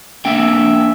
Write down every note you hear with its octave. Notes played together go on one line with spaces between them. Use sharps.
A#3 D4 E5 G5